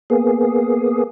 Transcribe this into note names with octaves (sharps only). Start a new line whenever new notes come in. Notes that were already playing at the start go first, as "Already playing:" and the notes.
A#3 B3 G#4